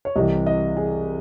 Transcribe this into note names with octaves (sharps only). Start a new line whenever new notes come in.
C#5
C2 C3 E3 D#5
D#5
G#4